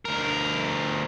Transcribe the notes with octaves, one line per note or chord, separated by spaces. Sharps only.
D2 A#4